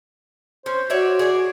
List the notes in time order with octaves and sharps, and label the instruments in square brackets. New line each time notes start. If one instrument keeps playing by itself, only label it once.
[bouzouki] C#4 [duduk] C5
[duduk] F#4 [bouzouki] C#5 D5 E5
[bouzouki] G#4 D5